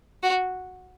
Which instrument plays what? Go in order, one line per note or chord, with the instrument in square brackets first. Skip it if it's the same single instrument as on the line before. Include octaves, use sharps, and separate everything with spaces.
[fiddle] F#4